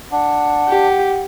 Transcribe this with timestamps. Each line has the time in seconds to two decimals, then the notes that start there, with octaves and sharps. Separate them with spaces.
0.12 D4 F#5
0.69 G4